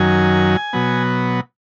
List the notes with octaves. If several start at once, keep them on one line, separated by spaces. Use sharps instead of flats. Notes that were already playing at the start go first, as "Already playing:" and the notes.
Already playing: F#2 D#3 F#3 G#5
B2 F#3 B3